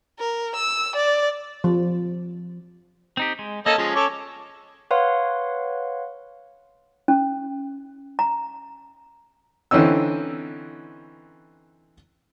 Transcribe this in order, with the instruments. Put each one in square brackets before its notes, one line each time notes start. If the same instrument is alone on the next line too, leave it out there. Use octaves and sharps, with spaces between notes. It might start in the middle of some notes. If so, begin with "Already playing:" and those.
[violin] A#4
E6
D5
[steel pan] F3
[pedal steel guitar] C4 D#4 G4
G#3
[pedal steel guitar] A#3 [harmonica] C#4 A4 D#5
[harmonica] F3 G#3 [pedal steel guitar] C#4
[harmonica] A4 C#5 D6
[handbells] B4 C#5 F5 F#5 C6
[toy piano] C#4
A#5
[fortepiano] D3 E3 C4 C#4 D#4 E6